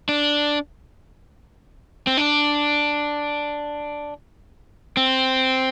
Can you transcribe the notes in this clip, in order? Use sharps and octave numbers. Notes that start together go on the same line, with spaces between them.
D4
C4
D4
C4